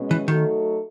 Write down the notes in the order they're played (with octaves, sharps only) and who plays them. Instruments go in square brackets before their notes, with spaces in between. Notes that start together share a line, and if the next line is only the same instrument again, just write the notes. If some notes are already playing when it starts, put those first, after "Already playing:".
Already playing: [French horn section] B2 G#3 C#4
[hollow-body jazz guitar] E3
[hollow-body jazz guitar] D#3 [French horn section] F#3 A3 D#4 F#4 A4